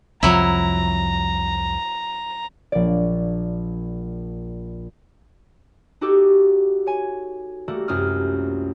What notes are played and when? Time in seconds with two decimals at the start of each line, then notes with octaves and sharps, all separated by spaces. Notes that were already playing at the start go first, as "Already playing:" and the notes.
0.23 C2 F2 F3 F#3 E4 A#5
2.72 A#1 D5
6.01 D#4 F#4 G4 A4 C#6 D6
6.86 C#5 G#5
7.68 G3 A3 A#3 F#4 A4
7.88 C2 F#2 C#4 F4 D#6 F6